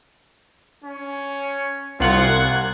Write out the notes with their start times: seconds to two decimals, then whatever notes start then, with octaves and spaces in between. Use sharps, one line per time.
0.84 C#4
2.00 C2 F4 F#5 G#6
2.37 A#3